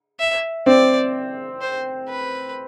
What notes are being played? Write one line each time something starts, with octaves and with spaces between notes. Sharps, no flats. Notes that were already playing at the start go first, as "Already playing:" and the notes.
E5
C4 D5
C5
B4